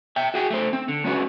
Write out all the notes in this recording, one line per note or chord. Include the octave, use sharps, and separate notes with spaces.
E5 G5
F#4 G#4 G5
A3 C5
C4
D3
G#3 C#4 F#4 B4